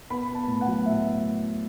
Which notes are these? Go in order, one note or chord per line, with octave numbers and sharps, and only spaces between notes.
B3 B5
B3
A5
A2
F#5
F#3
A2 E5